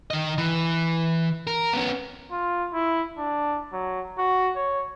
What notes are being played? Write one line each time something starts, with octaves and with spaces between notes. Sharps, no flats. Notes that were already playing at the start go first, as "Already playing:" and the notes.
D#3 D#5
E3
A#4
B3 C#4
F4
E4
D4
F#3
F#4
C#5